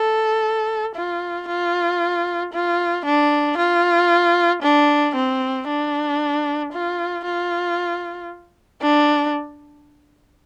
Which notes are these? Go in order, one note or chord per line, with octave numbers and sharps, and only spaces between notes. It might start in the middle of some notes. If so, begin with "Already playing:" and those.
Already playing: A4
F4
F4
F4
D4
F4
D4
C4
D4
F4
F4
D4